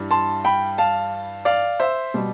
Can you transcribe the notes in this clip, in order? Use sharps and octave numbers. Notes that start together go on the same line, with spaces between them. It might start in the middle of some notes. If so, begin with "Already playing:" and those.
Already playing: G2 E3 G3
A5 C6
G5 B5
F5 A5
D5 F5
C5 E5
B2 G3